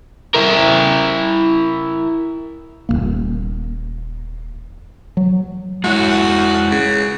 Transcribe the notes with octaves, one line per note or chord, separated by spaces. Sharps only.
E4 A#4
D#1 F2 A#3
F#3
G#3 E4 F#4 C#5
C#3